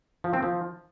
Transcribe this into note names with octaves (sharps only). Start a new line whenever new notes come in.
F3
C4
F3